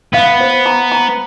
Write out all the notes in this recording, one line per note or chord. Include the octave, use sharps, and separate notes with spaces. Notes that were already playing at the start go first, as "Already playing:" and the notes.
B3 F5
C5
A#5
A#5